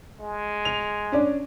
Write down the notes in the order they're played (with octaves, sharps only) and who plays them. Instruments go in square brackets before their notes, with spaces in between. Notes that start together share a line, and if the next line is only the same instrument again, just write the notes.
[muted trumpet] G#3
[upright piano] F7
C#4 D4 D5